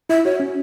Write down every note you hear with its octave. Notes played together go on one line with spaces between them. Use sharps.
E4 E5
F#4 C#5
C#4